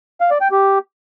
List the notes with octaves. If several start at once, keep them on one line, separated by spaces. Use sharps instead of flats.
F5
D5
G5
G4